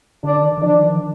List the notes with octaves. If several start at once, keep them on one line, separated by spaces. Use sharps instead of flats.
D3 D4
D#3
D#3
F3 D4
D#3